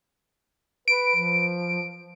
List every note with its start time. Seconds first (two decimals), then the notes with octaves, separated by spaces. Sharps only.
0.88 B4 D7
1.16 F3